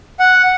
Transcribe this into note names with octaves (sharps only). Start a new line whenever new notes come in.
F#5